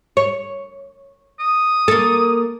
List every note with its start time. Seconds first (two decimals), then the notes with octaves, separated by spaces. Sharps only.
0.17 C#5
1.40 D#6
1.88 A#3 A4